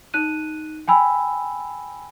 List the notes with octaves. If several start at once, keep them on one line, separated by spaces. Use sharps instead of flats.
D#4 F#6 D#7
G5 G#5 B5 E6